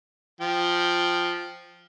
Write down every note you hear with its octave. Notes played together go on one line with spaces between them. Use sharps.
F3 G5